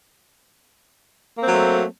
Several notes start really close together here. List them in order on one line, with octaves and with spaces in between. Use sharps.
A#3 C4 F#3 A3